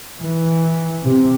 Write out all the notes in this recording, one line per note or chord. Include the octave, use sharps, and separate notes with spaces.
E3
C3